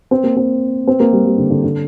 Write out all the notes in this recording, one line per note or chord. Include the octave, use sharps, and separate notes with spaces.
C4
A#3
C4
C4
A#3
G3
G3
D3
D3
D3